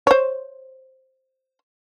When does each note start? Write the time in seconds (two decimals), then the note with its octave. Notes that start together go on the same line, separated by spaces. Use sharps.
0.07 C5 C#5